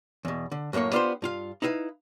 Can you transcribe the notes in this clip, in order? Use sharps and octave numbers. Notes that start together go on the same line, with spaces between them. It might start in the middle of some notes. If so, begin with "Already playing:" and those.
E2 B2
D3
F#2 A2 E3 A#3 C#5
B3 D4 F4 G4 C5
G2 F4 F5
D#4 E4 B4 E5 F5